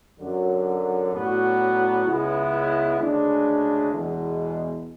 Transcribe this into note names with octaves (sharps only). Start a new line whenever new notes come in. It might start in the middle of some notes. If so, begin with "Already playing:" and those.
F#2 D3 F#3
A2 F#3 B3 D4 F#4
C#2 C#3 G#3 B3 E4
D2 C#3 G#3 D4
E2 B2 G#3